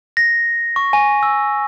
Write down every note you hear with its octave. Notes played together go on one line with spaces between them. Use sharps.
A#6
C#6
G#5
E6